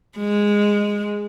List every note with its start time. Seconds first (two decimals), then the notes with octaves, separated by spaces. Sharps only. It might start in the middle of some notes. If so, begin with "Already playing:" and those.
0.18 G#3